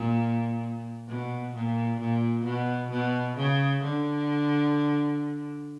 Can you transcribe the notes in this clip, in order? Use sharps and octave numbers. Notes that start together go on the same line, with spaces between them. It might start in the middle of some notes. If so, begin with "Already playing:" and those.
Already playing: A#2
B2
A#2
A#2
B2
B2
C#3
D3